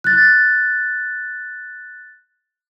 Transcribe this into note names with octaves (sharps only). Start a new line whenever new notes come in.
F#6 A6